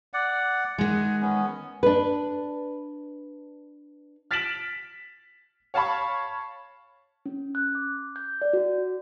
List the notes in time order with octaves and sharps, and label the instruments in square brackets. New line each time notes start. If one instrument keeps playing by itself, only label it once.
[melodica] D5 F#5
[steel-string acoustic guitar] D#3 G#3 [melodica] F#5 G#5
[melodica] B3 C#4
[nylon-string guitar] D4 B4
[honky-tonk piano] F6 A6 B6 D7 E7 F#7
C#5 F5 A5 B5 C#6
[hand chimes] C#4
F#6
D6
G6
D5
F#4